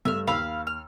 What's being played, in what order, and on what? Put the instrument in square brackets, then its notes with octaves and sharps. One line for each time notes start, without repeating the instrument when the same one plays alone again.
[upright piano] G2 A3 [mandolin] E5 F6
[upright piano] D#2 E6 [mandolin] F5 B5
[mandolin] F6